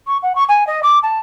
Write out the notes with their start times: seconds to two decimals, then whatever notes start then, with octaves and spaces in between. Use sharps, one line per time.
0.07 C#6
0.23 F#5
0.35 C#6
0.49 G#5
0.67 D#5
0.83 D6
1.03 A5